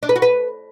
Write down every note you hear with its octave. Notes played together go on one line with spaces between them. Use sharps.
D4
B4
F#4
B4